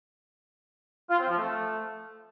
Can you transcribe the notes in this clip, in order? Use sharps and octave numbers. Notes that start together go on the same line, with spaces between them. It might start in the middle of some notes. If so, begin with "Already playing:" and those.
F4
C4
F3
A3